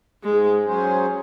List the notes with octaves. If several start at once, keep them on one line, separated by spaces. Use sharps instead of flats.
G#2 G#3
F#3 C#4 G#4 C5